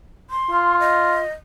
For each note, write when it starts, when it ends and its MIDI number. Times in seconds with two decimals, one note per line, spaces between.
0.30 0.79 84
0.51 1.22 65
0.80 1.32 75